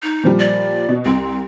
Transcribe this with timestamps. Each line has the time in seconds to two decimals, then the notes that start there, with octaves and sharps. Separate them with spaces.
0.03 D#4
0.24 A#2 F3 G3
0.39 D5
0.89 B2
1.06 C2 C4 C6